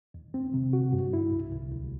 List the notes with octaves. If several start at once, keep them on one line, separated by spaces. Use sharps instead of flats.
E2
C4
C3
F#4
G2
E4
C2
C2
D2